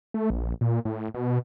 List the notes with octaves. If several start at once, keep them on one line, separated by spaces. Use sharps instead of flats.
A3
A#1
A#2
A2
B2